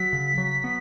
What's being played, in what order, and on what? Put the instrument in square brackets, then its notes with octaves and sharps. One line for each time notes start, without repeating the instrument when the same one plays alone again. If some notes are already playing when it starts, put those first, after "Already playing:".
Already playing: [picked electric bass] F#3 [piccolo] B6
[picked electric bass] C#3
F#3
B3